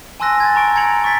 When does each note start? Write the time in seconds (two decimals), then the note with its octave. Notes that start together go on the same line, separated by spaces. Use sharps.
0.20 G#5 A5 C6 E6 F#6 A#6
0.40 G#6 A6
0.56 A#5 C#6 D7
0.75 A#5 G#6 A#6 C#7 F7 F#7
1.04 C#6 A6 B6